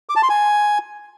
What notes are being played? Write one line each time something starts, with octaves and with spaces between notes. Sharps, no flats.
D6
A5
C6
G#5